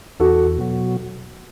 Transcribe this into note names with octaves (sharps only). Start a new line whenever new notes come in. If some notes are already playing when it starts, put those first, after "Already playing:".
E2 F#4 A4
B2 F#3